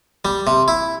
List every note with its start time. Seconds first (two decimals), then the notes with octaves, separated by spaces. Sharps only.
0.25 G3
0.47 C3
0.68 E4